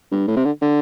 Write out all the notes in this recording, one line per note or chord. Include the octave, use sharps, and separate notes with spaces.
G2
A2
C3
D3
D3